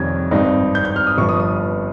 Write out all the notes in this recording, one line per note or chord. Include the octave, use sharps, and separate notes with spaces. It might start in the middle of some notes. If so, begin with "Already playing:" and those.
Already playing: F2 C3 D#3 G3 C#4 G#6
G#1 G2 G3 C4 D#4
G6
G6
F6
D#6
G1 G2 F3 C#6
D#6
D#6